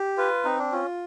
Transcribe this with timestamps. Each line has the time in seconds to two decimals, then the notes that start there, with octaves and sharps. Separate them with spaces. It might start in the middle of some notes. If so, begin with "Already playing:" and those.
Already playing: G4
0.17 F4 B4
0.45 C4 D#4
0.59 D4
0.72 C#4 F4